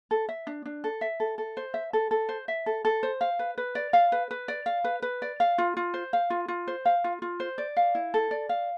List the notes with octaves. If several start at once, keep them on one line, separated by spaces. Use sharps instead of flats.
A4
E5
D4
D4
A4
E5
A4
A4
C5
E5
A4
A4
C5
E5
A4
A4
C5
F5
B4
B4
D5
F5
B4
B4
D5
F5
B4
B4
D5
F5
F4
F4
C5
F5
F4
F4
C5
F5
F4
F4
C5
D5
F5
E4
A4
D5
F5